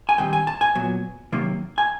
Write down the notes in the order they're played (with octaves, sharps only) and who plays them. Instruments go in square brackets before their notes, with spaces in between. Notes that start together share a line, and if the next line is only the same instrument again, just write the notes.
[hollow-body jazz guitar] G#5
G2 D#3 G3 C4 G5
G#5
A5
G#5
A#2 F#3 B3
C3 D#3 F#3 A#3
G#5